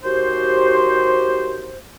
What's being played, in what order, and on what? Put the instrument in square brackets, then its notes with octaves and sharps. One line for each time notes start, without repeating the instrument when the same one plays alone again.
[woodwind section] D#2 F#4 G4 C5